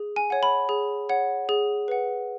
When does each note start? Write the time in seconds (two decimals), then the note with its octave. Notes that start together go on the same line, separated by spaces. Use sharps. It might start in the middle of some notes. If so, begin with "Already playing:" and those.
Already playing: G#4
0.16 G#5
0.30 C#5 F#5
0.43 B5
0.69 G#4
1.09 C#5 F#5
1.49 G#4
1.88 B4 F#5